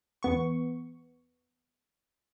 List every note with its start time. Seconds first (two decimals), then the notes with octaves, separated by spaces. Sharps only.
0.23 E2 B3 C#6